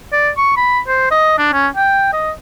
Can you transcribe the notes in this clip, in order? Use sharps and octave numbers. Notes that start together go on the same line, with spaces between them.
D5
C#6
B5
C5
D#5
D4
C#4
G5
D#5